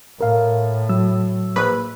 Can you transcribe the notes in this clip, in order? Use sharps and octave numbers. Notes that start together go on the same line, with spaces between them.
A2 A#4 F5
F#3 E6
A#1 B4